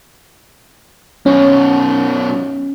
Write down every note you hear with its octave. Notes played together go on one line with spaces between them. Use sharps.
F#2 B2 C#4